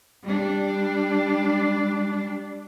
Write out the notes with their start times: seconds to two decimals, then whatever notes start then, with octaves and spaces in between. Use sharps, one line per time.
0.23 G3 D4